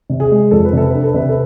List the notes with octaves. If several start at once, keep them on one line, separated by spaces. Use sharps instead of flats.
C3
G#4
G#3
F2 A4
B4
C3 A4
D4 B4
A4
C3 B4
A4